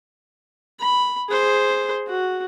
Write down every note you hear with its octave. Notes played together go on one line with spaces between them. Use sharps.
B5
G#4 C5
F#4